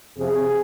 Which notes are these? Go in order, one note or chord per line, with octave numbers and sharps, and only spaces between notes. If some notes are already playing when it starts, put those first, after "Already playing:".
F2 C3 F3 G#4